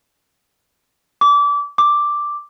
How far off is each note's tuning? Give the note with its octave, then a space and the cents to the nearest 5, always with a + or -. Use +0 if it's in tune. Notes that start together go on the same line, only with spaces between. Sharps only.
D6 -25
D6 +0